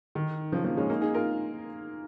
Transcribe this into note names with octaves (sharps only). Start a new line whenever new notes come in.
D#3
C#3 F3
F3 A#3
G#3 C#4
A#3 D#4
D#4 G#4
F4 A#4